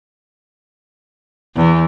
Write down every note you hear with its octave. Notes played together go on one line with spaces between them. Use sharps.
E2